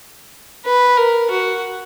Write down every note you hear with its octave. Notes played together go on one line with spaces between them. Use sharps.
B4
A#4
F#4